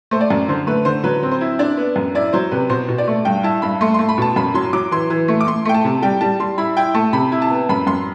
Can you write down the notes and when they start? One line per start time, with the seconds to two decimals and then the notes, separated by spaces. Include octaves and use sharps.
0.11 A3 C5
0.21 D5
0.30 F#2
0.49 D3 C5
0.67 A3 B4
0.85 D3 C5
1.04 F#3 B4
1.23 C4
1.31 C5
1.41 E4
1.59 D4 D5
1.77 B3
1.96 F#2
2.15 E4 D5
2.33 F#3 C5
2.51 C3 B4
2.69 B2 C5
2.88 B2
2.98 D5
3.07 A3
3.25 G2 G5
3.43 E4 A5
3.62 G2 B5
3.81 A3 C6
3.94 A3 C6
4.09 B5
4.18 B2 A5
4.36 F#2 B5
4.54 F#3 C6
4.73 F#3 D6
4.91 E3 C6
5.10 E3
5.28 A3
5.41 D6
5.47 A3 C6
5.65 A3 G5
5.74 A5
5.84 C3
6.02 G3 G5
6.21 G3 A5
6.40 G3 C6
6.58 E4 B5
6.77 E4 G5
6.94 A3 A5
7.13 C3 B5
7.32 E4
7.42 A5
7.51 B3
7.69 F#2 B5
7.87 F#2 C6